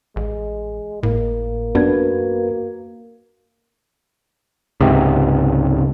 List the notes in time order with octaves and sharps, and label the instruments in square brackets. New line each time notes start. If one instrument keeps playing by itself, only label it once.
[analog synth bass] A1 [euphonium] G#3
[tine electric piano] G#1 [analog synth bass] A2 [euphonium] A#3
[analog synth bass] F#2 [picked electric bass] B3 D4 [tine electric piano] F#4 B4 G#6
[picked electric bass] C#2 G#2 C3